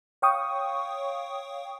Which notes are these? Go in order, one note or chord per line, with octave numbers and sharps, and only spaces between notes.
C#5 F5 G5 C#6 D#6